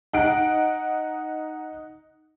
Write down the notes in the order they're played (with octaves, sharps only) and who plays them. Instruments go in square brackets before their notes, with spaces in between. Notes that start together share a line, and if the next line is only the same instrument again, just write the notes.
[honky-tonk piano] D#4 F#5 D7